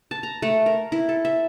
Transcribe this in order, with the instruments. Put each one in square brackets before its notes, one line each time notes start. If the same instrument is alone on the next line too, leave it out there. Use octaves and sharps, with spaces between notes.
[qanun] A5
A#5
A3
A#4
E4
A4
E5